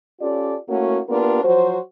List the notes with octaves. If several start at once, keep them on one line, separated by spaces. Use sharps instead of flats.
C#4 F4 G4 A4 D5
A3 A#3 C#4 E4 F#4
A#3 B3 D4 F4 G4 A#4
F3 F#3 F#4 C5